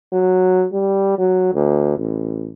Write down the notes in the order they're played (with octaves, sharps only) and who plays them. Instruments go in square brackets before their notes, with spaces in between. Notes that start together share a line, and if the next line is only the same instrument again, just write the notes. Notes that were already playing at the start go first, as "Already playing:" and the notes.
[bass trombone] F#3
G3
F#3
D2
A1